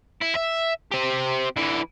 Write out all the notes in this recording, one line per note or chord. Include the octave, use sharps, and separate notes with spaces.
E4
E5
C4 G4
D3 E3